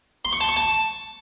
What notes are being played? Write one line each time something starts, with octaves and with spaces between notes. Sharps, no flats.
C6
C#6
A5
C#6
A5